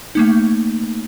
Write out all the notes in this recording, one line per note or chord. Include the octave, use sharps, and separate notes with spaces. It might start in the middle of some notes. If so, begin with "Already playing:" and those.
A3 A#3 D#4